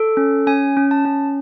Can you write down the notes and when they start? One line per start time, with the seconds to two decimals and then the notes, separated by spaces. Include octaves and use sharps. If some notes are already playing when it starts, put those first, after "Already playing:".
Already playing: A4
0.17 C#4
0.47 C#4 G#5
0.77 C#4
0.91 A5
1.05 C#4